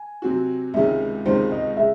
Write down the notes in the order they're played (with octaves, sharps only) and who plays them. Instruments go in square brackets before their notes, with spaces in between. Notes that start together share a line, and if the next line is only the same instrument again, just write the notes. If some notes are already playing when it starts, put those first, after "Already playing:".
Already playing: [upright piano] G#5
[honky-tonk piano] C3 F#3 C4 F#4
[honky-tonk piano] C#2 C3 D#3 G#3 C#4 [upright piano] E5
[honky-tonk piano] C#2 C3 D#3 G#3 C#4 [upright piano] C5
[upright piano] D#5
[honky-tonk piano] C#3 G#3 [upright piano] E5